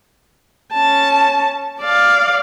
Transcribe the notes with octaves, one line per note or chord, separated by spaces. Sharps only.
C#4 A5
D5 F5